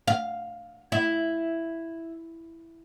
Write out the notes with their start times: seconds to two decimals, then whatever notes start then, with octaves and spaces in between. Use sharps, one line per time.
0.08 F5
0.92 E4